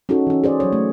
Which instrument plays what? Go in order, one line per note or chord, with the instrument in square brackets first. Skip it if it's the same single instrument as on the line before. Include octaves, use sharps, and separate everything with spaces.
[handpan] C#4 D#4 F#4 G#4 A4
E3 C#4
G#4 C5 D5
F#3 C#5
A3